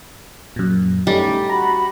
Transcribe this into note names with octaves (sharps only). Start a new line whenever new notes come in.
F#2 A#2
G3 A3 C#4 D#4
F#4 A#5 B5